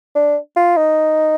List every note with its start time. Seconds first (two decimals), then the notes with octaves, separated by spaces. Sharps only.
0.15 D4
0.56 F4
0.77 D#4